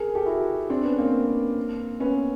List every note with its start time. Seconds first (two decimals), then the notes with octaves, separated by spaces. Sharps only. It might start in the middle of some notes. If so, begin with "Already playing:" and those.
Already playing: G#4 A#4
0.15 G4 A4
0.26 E4 F#4
0.70 C4 D4
0.84 B3 C#4
0.98 A#3 C4
2.00 B3 C#4